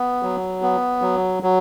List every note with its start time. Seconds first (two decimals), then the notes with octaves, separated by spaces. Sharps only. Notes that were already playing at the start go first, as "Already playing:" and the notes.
Already playing: B3
0.23 F#3
0.62 B3
1.02 F#3
1.43 F#3